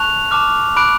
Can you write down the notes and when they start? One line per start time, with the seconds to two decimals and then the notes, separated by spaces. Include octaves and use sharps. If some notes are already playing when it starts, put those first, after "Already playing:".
Already playing: A5 C#6 F#6 F7
0.31 A5 D6 F6
0.76 B5 D6 F#6 D7